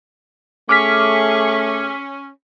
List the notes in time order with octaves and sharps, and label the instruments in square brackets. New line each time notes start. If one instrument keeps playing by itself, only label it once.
[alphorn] A3 [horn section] C#4 [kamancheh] G#4 C#6 [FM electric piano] D6 F6 B6